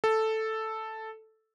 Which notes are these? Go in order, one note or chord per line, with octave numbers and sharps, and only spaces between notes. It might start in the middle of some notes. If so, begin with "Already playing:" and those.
A4